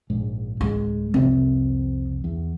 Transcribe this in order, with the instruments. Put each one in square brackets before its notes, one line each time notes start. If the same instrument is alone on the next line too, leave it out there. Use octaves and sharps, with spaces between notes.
[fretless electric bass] A#1 G#2
[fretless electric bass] D1 [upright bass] G#3
[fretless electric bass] C2 F2 C4 [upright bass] C3
[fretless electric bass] E2